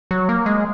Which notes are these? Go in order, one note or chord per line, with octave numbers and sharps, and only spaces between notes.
F#3
A#3
G#3